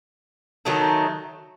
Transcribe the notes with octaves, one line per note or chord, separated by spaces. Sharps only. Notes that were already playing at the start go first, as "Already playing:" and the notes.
D#3 F#3 A3 D#4